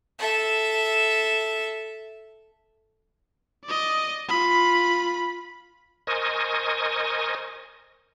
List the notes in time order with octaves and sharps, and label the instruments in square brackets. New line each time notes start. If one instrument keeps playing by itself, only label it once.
[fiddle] A4 E5
[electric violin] D5 D#5
F4 B5
[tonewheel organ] A#4 C5 D#5 G#5 C#6 D#6